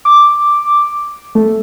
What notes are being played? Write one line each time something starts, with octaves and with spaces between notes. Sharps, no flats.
D6
A3